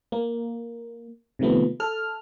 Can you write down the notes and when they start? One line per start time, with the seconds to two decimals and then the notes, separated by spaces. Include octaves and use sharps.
0.12 A#3
1.39 C3 D#3 F3 A3 B3
1.80 A4 F6